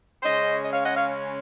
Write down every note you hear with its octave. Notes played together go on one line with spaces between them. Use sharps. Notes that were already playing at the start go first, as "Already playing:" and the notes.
C#3 G#3 C#4 C5 D#5
D#5
C#5 F5
D#5 F#5
C#5 F5